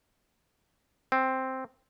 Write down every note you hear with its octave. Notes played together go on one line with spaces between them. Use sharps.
C4